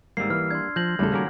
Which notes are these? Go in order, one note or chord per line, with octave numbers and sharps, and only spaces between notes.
G#1 G#2 G3 A#3 E6 C7
E3 B4 F6
D4 C6 G#6
F3 G6 A#6 F#7
E2 A2 C#3 G3 A3 A4 F#6
D#3 A#3 C#4 F#4 A#4 D6